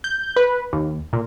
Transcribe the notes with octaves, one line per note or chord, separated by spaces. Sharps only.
G6
B4
D#2
A#2